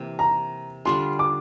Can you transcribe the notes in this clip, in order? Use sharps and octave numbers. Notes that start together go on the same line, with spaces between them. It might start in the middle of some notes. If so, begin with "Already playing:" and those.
Already playing: C3 E3 A#3
A#5
D3 G3 D4 F4 C6
D6